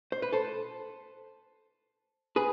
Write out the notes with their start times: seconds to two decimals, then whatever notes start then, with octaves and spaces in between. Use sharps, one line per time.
0.12 C5
0.22 B4
0.32 A4 C5
2.36 G#4 B4